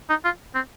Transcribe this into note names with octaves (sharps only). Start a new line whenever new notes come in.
D#4
F4
C4